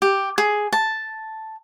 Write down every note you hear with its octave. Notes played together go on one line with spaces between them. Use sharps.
G4
G#4
A5